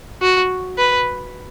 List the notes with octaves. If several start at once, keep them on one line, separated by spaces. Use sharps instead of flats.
F#4
B4